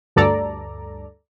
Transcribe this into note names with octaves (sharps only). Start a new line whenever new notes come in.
D2 G2 A4 D5 A#5